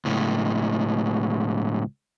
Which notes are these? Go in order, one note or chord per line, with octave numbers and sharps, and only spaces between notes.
C#2 A2